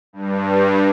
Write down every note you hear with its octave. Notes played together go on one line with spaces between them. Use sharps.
G2